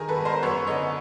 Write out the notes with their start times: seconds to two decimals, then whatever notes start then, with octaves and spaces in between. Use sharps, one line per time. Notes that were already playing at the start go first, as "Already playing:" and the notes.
Already playing: D#3 G#4 A#4
0.08 A4 B4
0.16 G#2
0.25 A#4 C5
0.43 F#2 B4 C#5
0.67 D3 C#5 D#5